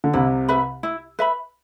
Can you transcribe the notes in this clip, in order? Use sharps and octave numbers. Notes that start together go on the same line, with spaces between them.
D3
C2 C3 E4
B4 E5 B5
E4
B4 E5 B5